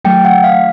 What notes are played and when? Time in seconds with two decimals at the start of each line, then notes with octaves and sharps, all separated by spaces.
0.04 D#3 F#3 A3 G5
0.25 F#5
0.44 F5